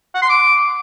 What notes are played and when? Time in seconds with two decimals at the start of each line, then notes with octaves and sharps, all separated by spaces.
0.15 F#5
0.22 C6
0.29 D6